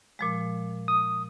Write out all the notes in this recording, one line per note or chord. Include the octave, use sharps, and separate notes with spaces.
A#2 F3 G#3
D#6